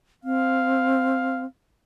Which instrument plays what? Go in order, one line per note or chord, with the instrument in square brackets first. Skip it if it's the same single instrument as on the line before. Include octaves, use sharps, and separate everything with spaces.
[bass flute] C4 [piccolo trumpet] F5